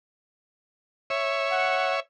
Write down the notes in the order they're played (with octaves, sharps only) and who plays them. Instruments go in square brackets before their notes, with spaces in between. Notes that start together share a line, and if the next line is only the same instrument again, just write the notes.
[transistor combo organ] C#5 E5
[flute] F#5